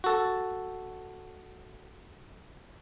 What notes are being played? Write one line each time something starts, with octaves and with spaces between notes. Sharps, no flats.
F#4 A4